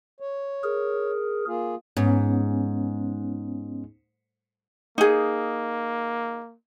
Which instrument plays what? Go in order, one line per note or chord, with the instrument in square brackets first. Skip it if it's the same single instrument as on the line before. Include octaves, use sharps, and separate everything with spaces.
[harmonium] C#5
[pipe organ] G#4 A#4
[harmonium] A#3 F4 G#4
[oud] G#2 [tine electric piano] B3 C#4
[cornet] A#3 [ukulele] D#4 G#4